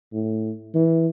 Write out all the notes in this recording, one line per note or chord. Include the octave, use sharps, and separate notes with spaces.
A2
E3